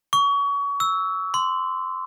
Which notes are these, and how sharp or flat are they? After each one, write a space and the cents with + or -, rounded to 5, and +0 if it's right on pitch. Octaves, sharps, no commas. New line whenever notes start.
C#6 +30
E6 -10
C6 -15